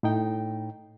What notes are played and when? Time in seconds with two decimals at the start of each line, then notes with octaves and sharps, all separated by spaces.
0.03 A2 D#4 G5